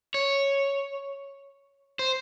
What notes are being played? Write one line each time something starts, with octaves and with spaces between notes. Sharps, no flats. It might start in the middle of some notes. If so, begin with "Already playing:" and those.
C#5
C5